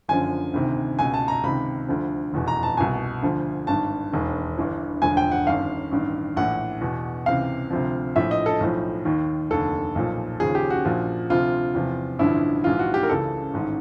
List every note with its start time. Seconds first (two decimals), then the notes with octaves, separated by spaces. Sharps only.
0.08 F#1 F#2 D3 F3 G#5
0.54 D2 C3 D#3
0.99 C#2 B2 G#5
1.14 A5
1.28 A#5
1.43 C#2 C3 D#3 B5
1.88 D2 D3 F3
2.33 F1 E2 B2
2.48 A#5
2.63 A5
2.77 C2 B2 G#5
3.22 D2 D3 F3
3.67 G#1 G2 D#3 A5
4.12 E1 D#2 D#3
4.58 G1 G2 E3
5.02 E1 D2 D3 F3 G#5
5.17 G5
5.31 F#5
5.47 G1 F#2 D#3 F5
5.91 A1 G2 D#3
6.37 A#1 A2 E3 F#5
6.81 E2 B2
7.26 C#2 C3 E3 F5
7.70 D2 C3 F3
8.16 A#1 A2 F3 E5
8.31 D#5
8.46 A4
8.61 B1 A2 F3
9.05 D#2 D#3
9.50 F1 D#2 D3 A4
9.95 B1 A#2 F3
10.40 D#2 C#3 F3 G#4
10.55 G4
10.70 F#4
10.85 A#1 A#2 F3
11.29 D2 C3 F3 F4
11.75 E2 C3 F3
12.19 A1 G2 D3 F3 E4
12.64 A#1 G#2 E3 F4
12.79 F#4
12.94 G4
13.03 A#4
13.09 C#2 C#3 E3 A4
13.53 A1 G#2 D#3